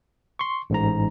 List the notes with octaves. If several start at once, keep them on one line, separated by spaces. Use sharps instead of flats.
C6 C#6
A1 G#2 A#5